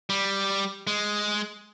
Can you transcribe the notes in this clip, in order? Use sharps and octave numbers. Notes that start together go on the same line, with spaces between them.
G3
G#3